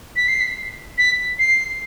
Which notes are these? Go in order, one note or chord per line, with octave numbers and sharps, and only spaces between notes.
B6
C7
B6
B6
C7